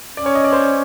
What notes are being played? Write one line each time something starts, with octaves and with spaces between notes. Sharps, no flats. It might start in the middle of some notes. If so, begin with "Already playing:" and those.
C#4 D5
C#5
D#5
D5
C5